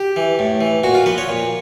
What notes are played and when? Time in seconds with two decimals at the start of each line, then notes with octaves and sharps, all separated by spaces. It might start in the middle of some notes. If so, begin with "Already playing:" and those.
Already playing: G4
0.16 E3
0.39 A2
0.61 E3
0.84 A#2 F#4
0.95 F4
1.06 F3 B4
1.18 C#5
1.29 A#2